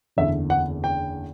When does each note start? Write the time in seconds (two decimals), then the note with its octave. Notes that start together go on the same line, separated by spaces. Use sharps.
0.17 F#1 E2 D3 E5
0.50 F#5
0.84 G5